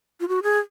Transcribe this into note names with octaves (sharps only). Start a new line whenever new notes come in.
F4
F#4
G#4